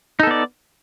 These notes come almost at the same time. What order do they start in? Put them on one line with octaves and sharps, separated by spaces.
D#4 A4 B3 D5